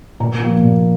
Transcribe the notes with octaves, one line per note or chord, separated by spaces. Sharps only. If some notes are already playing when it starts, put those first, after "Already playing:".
A#2 A#5
F3 A#3
A#2